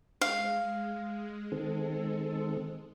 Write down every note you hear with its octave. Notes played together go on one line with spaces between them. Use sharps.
G#3 F5
D#3 C4 A4